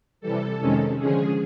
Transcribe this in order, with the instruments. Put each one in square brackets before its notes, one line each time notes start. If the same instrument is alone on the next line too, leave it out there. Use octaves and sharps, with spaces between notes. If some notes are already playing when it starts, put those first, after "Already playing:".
[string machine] C3 E3 G3 A4
F2 C3 D#3 G#3 C#4
D3 F3 G#3 C#4 G#4